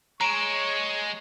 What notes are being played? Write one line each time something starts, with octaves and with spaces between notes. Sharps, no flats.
G#3 C#5 A#5 C#6 D7 E7